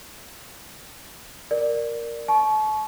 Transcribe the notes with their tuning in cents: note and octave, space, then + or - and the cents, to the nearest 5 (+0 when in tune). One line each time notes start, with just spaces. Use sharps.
A#4 +0 D5 +0
A5 -40 C#6 +0